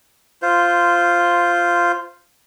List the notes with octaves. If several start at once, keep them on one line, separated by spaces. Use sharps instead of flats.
F4 C5